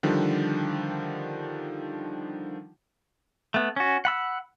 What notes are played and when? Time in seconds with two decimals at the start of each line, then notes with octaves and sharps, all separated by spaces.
0.03 D3 D#3 F3 G3 D4
3.54 A3 B3
3.76 C#4 F#4
4.05 F#5 B5 E6